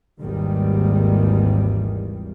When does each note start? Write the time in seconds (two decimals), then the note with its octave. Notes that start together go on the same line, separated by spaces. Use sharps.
0.21 G#1 D#2 G#2 D#3 E3 G3